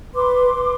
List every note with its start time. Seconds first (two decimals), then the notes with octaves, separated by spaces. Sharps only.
0.14 B4 C6 D6
0.54 B4